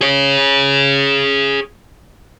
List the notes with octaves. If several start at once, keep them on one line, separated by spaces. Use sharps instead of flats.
G#4 C#5